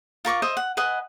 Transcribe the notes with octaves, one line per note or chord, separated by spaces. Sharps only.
F4 A#4 C#6 D6
C5 D#5 E5
F#5
B4 D#5 F#5 G#5